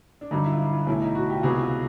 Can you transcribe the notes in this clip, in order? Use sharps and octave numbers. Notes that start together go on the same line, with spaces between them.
D4
G2 D3 F#3 D#4
E4
F4
E4
F4
B1 A2 E3 E4
D#4
F#4
G4
F4
C#2 C3 E3 G#3 B3 F#4
F4